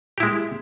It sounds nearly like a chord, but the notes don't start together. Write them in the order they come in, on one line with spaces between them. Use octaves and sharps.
G4 E4 G#3